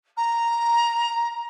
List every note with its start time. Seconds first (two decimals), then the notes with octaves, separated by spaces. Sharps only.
0.17 A#5